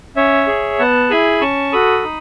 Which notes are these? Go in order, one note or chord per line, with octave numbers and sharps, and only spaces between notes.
C#4 C#5 E5
G#4
B3 F#5 A5
E4 G#4 G#5 B5
C#4 A5 C#6
F#4 A4 B5 D#6
D#4